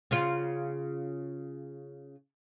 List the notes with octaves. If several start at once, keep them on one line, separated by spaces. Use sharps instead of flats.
C#3 F4